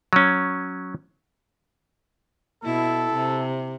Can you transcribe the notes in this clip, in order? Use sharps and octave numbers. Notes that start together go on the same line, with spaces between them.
F#3 C#4
B2 E4 A4
C3